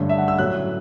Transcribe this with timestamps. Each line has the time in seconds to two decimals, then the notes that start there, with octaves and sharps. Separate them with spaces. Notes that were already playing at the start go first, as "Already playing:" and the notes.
Already playing: G2 D3 A3 C#4
0.09 E5
0.18 F#5
0.28 E6
0.39 A2 F#3 C#4 F#6